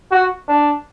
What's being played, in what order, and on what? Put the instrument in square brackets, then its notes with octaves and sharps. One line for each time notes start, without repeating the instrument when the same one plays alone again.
[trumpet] F#4
D4